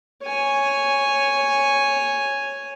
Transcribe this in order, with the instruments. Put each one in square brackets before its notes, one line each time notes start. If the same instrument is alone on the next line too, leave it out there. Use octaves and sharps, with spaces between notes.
[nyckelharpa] C#5 G#5